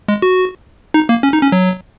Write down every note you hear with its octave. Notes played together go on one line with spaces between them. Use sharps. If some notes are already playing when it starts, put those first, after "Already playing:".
G#3
F#4
D#4
A#3
C#4
D#4
C#4
F#3